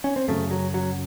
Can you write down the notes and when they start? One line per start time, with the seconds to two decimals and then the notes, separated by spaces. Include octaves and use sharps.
0.04 C#4
0.16 C4
0.28 F#2 C#3 A3
0.51 F#3
0.74 F#3